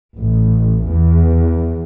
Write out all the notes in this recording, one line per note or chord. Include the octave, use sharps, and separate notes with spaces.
A1
E2